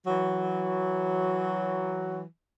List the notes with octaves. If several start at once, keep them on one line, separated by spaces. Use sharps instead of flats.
E3 F#3